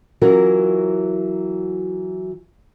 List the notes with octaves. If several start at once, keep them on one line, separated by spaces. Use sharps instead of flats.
E3 F#3 C#4 F4 F#4 A#4